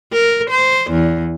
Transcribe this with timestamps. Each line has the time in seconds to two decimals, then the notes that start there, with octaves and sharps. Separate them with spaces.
0.12 A#4
0.50 C5
0.91 E2